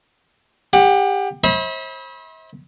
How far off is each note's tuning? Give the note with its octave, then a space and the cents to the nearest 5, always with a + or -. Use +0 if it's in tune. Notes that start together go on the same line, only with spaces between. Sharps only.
G4 +25 F#5 +0
C5 +35 E5 -45 B5 -25